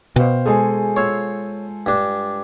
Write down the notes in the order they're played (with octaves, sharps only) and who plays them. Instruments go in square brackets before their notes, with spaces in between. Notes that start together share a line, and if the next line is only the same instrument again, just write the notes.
[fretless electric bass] B2 [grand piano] C5 F5 G5
[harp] G#3 F#4 G#4 [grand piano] A4 C5 G#5
[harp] F4 E6 [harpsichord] C#5
[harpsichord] G2 D4